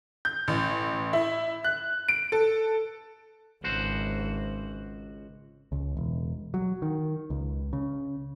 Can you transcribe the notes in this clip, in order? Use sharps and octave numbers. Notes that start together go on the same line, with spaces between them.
G6
A1
E4
F#6
D7
A4
G#1 C#2 F#4 C5
C#2
E1
F#3
D#3
C#2
C#3